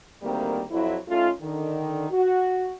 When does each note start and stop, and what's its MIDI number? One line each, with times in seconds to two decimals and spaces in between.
0.22 0.62 38
0.22 0.62 51
0.22 0.62 55
0.22 0.62 58
0.22 0.62 60
0.70 0.95 41
0.70 0.95 54
0.70 0.95 64
1.08 1.29 57
1.08 1.29 61
1.08 1.29 63
1.08 1.29 65
1.41 2.06 50
1.41 2.06 51
2.11 2.73 66